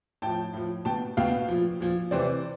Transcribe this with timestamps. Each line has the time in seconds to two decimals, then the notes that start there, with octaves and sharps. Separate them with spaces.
0.22 A2 F3 G5 A5
0.53 A2 F3
0.85 B2 G5 A5
1.17 B2 F5 G5
1.48 A#2 F3
1.80 A#2 F3
2.11 C3 E3 C5 D5